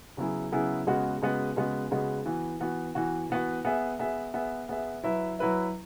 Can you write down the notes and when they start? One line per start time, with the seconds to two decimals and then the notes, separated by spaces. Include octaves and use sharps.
0.17 C#3 F#3 B3 E4 G#4
0.52 C#3 F#3 B3 E4 G#4
0.87 C#3 G#3 B3 F#4
1.22 C#3 G#3 B3 F#4
1.56 C#3 G#3 B3 F#4
1.91 C#3 G#3 B3 F#4
2.26 E3 B3 F#4
2.60 E3 B3 F#4
2.95 E3 B3 F#4
3.29 E3 B3 F#4
3.65 B3 G#4 E5
3.99 B3 G#4 E5
4.34 B3 G#4 E5
4.69 B3 G#4 E5
5.04 F#3 E4 B4 E5
5.39 F#3 E4 B4 E5